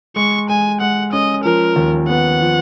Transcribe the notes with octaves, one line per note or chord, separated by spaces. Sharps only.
G#3 C#6
G#3 G#5
G#3 F#5
C#4 D#5
F3 A#4
D#2
B3 F#5
F3